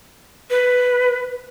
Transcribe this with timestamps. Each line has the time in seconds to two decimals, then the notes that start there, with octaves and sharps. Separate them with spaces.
0.50 B4